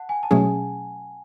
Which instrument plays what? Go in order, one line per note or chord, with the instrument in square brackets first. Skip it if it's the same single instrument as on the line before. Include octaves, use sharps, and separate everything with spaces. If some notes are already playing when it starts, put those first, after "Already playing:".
Already playing: [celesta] F#5 A5
G#5
A5
[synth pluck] B2 F#3 A3 C#4 G#4 [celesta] G#5